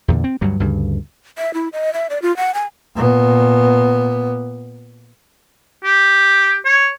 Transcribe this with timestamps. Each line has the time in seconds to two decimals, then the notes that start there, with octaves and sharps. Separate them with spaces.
0.08 E2 A#2 D3
0.24 C4
0.41 D2 G2 F#3 G3
0.60 D2 G2 C#3
1.38 E5
1.54 E4
1.73 D#5
1.94 E5
2.10 D5
2.22 F4
2.37 F#5
2.54 G#5
2.96 A#2 B3
5.84 G4
6.65 C#5